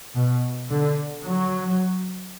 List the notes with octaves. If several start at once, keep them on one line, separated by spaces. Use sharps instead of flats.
B2
D3
F#3